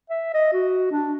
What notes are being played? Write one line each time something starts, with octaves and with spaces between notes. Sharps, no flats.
E5
D#5
F#4
D4